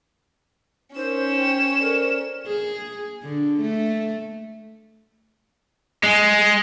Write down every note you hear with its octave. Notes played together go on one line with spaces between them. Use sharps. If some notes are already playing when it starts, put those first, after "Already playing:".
C#4 D#4 A#4 C5 E7
G5
A4 A#4 C5 D5
G#4
D3
A3
G#3